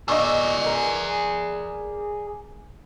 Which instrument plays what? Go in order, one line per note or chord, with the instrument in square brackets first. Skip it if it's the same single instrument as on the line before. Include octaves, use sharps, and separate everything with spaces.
[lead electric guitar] G#4 D5 [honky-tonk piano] D#5 C#6 E6
[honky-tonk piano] A#4